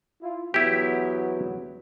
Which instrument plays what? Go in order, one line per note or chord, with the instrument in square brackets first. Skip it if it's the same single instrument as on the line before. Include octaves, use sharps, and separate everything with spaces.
[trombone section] E4 F4
[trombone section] E2 F#3 B3 [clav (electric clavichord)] E4 G4